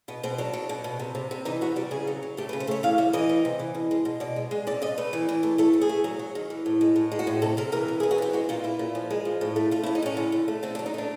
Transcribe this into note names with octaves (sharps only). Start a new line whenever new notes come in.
B2 B3
B2 C4
F#3 D4
F#3
B2
B2
C3
C3
C3
E3 D#4
C3 F#4
G3 G4
C#3 G#4
F#3
F#3
A3 G4
B4
C#3
C5
A3 C#5
E3 F5
G3 E5
E3 D#5
G3
C3
E3
B2
G#3
B2
B2 D5
G#3
G#3
C3 D5
C3 D#5
A3 B4
E3
E3
A3
A3 A4
F#3
G#4
A3
F#3
F#3
D#3
E3
A2
G#3
A2
G#3
F#4
A2
C3 A4
C3 A#4
E3 A#4
C3
G#4
E3
F#4
C3 G4
G#3 F#4
A#2 F4
A#2 E4
A#2
F3
G#3
F3
A2
A3
A3 F4
E4
A2
D#4
A2 C#4
D3
D3
A3
D3 C4
D4
F#3
D#4
A3 D4